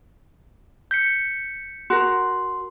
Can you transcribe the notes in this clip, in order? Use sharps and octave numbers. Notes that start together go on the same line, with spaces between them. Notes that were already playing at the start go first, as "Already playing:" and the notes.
G6 B6 C#7
F#4 A#4 C6